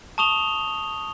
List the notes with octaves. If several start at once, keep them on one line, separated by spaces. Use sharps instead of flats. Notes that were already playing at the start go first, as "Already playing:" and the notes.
A5 C#6 D#6 F7 G7